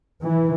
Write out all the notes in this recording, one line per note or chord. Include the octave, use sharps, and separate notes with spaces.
E3